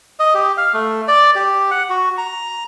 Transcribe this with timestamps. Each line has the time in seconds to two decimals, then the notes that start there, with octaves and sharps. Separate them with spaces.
0.20 D#5
0.34 G4
0.57 F5
0.73 A3
1.08 D5
1.35 G4
1.71 F#5
1.90 F#4
2.18 A#5